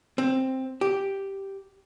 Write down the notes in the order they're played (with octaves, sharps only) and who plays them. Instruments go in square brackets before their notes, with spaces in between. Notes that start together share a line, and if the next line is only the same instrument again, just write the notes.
[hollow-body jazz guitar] C4
G4